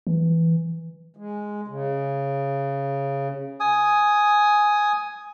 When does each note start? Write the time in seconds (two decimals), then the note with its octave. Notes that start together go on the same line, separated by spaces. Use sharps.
0.07 E3
1.17 G#3
1.68 C#3
3.60 G#5 D#6